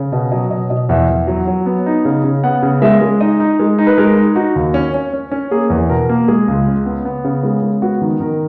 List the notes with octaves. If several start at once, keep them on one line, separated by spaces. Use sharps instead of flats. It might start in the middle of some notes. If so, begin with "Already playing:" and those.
Already playing: C#3
B2 D#5
F#3 D#5
B2 D#5
B2 D#5
E2 E5
E2
F#3
F#3
B3
D#4
C#3
C#3
B3 F#5
C#3
G#3 E5
G#3
D#4 D#5
D#4
G#3
D#4
B4
G#3 A#4
D#4
D#4 F#4
D#2
C#4
C#4
C#4
C#4
A#3 G#4
E2
B2 A#4
A#3
G#3 G#4
C#2
C#3
B3
B3
C#3
G#3
G#3
B3 F#4
D#3
D#3 A#4